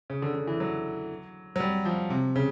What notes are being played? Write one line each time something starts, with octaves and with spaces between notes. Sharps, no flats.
C#3
D3
D3
E3
F#3
F#3
G3
F3
C3
C#3